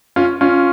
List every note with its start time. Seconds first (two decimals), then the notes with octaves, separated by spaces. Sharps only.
0.16 C#4 F4
0.41 C#4 F4